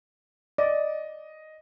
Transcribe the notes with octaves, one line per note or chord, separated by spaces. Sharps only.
D5 D#5